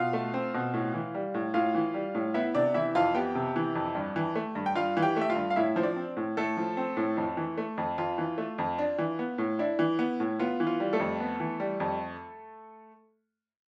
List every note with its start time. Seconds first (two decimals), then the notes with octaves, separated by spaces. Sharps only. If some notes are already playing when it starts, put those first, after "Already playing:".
Already playing: B2 F4 F5
0.13 A3
0.34 C4
0.54 B2
0.74 A2
0.94 E3
1.14 G3
1.34 A2
1.54 A2 F4 F5
1.75 E3
1.94 G3
2.15 A2
2.34 B3 E4 E5
2.54 C3 D4 D5
2.74 E3 E4 E5
2.95 F2 F4 F5
3.15 B3 G4 G5
3.35 C3
3.56 E3
3.75 F2
3.95 G2
4.16 E3
4.35 A3
4.55 G2
4.66 G5
4.75 G2 F4 F5
4.97 E3
5.02 G4 G5
5.16 A3 E5
5.30 F4 F5
5.36 G2
5.50 F5
5.56 A2 E4 E5
5.76 F3 C5
5.83 D4 D5
5.96 C4
6.17 A2
6.37 A2 A3 A4
6.57 F3
6.77 C4
6.97 A2
7.17 F2
7.37 E3
7.58 A3
7.78 F2
7.98 F2 F4
8.18 E3
8.38 A3
8.58 F2
8.78 D4
8.99 E3
9.19 B3
9.38 A2
9.59 D4 E4
9.79 E3
9.99 B3
10.20 A2
10.39 B3 F4
10.60 E3
10.67 F4
10.80 G3
10.93 A3 A4
11.00 F2
11.20 B3
11.40 E3
11.60 G3
11.80 F2